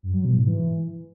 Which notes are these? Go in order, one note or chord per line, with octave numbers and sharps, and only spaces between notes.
F#2
F#3
B2
G#2
E3